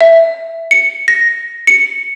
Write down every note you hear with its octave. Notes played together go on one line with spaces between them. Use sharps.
E5
C#7
A#6
C#7